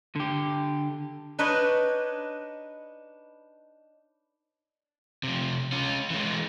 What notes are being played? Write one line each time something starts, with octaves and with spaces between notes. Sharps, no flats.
D3 G4
D4 D#4 B4 C#5 D#5
C3 F3
C#4 F4
E3 G#3